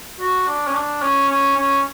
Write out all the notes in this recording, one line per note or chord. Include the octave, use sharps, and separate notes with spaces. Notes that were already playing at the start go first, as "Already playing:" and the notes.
F#4
D4
C#4
D4
C#4
C#4
C#4